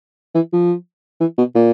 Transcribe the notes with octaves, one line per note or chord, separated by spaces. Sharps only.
E3
F3
E3
B2
A#2